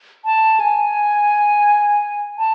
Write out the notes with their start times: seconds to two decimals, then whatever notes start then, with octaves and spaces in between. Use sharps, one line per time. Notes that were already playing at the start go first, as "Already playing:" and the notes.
0.25 A5
0.60 G#5
2.38 A5